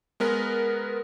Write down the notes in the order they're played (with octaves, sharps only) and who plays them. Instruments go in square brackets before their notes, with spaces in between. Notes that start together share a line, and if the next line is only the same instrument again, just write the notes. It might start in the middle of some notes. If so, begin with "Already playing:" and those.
[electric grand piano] G#3 B3 A#4 B4